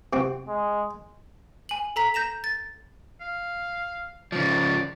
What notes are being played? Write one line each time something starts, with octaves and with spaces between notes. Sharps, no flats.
C3 C4 F#4
G#3
G#5 F#7
A4 A#5 B6
G6 A#6 E7 F7
A6
F5
C#3 F3 D5